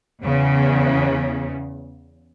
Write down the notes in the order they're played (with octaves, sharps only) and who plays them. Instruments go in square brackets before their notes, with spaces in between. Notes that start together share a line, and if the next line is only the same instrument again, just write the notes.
[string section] E2 C#3